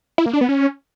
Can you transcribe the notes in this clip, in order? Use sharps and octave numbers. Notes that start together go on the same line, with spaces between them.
E4
A#3
D4
B3
C#4